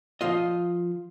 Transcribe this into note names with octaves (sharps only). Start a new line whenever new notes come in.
F3 F4 D#5